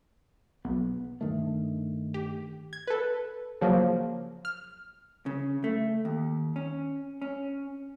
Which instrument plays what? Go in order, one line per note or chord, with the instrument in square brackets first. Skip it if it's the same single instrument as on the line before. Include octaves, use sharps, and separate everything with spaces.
[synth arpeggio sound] B1 [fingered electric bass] B3
[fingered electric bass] G2 D#3 A3
[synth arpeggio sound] G4
G#6
A4 B4
C#3 F3 F#3 A#3
F6
[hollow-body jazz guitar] C#3
A3
D#2
C#4
C#4